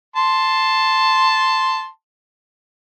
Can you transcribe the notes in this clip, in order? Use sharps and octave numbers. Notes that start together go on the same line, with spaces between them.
A5 C6